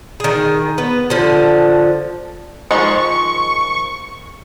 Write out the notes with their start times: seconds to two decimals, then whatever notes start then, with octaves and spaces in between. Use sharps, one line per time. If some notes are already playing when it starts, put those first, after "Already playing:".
0.20 D#3 G#4
0.78 B3
1.10 D3 F3
2.71 D#3 F3 G#3 C#6